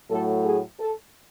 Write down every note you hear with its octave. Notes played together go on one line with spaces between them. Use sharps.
A2 F#3 A3 A4
G#4
A4